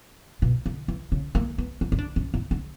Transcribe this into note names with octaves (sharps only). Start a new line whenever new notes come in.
B2
D3
E3
C#3
A#3
B3
C#4
E4
D4
C#4
E4
D4